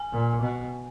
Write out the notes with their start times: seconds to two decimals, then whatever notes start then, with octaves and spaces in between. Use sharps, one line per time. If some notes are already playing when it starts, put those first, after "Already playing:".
Already playing: G#5
0.12 A#2
0.42 B2